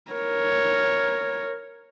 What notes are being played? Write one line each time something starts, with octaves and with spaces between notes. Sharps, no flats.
A#4 C#5